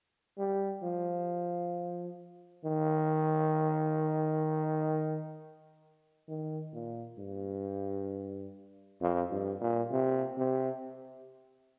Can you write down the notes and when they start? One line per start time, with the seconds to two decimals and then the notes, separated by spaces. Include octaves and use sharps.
0.38 G3
0.83 F3
2.65 D#3
6.29 D#3
6.74 A#2
7.19 G2
9.01 F2
9.31 G2
9.61 A#2
9.92 C3
10.38 C3